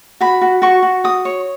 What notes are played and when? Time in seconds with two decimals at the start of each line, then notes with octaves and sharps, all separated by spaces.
0.21 F#4 B5
0.41 F#4
0.62 F#4 C#6
0.82 F#4
1.04 F#4 D#6
1.25 C#5